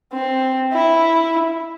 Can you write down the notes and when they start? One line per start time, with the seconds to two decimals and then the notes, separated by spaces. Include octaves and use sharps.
0.13 C4
0.73 E4